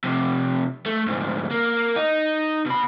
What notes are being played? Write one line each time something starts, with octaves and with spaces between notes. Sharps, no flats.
F2 C3
A3
D2 G#2
A#3
D#4
B2 B5